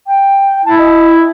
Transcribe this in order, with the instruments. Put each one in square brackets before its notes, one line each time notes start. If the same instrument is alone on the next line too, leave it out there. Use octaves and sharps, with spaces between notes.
[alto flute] G5
[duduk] E4 [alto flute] A5
[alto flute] D#5